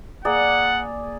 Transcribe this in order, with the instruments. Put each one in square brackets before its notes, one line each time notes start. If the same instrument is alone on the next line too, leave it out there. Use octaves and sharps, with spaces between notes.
[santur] A#3 G#4 D5 [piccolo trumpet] F#5